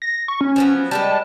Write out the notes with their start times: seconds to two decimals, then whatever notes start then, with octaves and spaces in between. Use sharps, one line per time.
0.02 A#6
0.28 C#6
0.41 C#4
0.56 F3 F#3 B3
0.91 G3 G#3 B3 A5